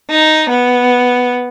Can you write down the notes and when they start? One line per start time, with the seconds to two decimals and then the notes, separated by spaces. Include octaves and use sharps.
0.10 D#4
0.49 B3